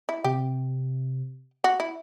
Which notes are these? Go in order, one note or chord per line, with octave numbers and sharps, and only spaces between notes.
E4
C3 G4
F#4
E4